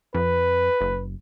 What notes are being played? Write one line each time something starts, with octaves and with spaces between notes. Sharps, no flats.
F2 B4
F#1